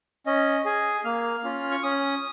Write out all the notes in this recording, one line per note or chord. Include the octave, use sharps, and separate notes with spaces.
C#4 D#5
G#4 G#5
A#3 F6
C#4 F4
C#6
C#4 D#6